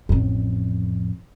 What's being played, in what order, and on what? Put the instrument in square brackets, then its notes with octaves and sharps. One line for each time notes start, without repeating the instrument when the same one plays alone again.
[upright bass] A1 F2